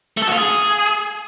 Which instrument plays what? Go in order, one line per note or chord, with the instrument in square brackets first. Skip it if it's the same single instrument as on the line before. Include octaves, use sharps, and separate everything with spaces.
[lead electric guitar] A3
A4
F#4
F4
G#4